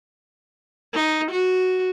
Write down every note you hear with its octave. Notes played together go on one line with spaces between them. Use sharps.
D#4
F#4